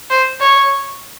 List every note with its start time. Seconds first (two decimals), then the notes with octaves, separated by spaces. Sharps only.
0.10 C5
0.41 C#5